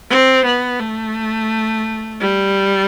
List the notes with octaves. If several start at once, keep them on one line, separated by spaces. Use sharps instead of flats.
C4
B3
A3
G3